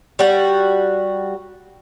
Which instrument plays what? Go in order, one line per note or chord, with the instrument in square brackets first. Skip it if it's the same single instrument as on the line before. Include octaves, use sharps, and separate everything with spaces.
[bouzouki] G3 F#4